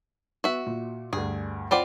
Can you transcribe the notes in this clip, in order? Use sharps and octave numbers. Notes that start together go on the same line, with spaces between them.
B3 F#4 E5
A#2
D2 G2 G#4
C4 F4 D5 F#5 G5 B5